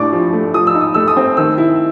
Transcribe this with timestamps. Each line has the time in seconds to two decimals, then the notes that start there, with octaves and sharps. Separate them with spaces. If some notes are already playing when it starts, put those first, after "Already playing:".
Already playing: A2 D4 C#6 D6
0.13 F3
0.33 A3
0.54 F3 D#6
0.67 E6
0.75 D#4
0.80 D#6
0.94 A3 E6
1.08 D#6
1.17 C4
1.37 D#3 E6
1.58 E4